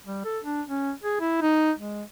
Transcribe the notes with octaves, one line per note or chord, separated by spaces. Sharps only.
G3
A4
D4
C#4
G#4
E4
D#4
G#3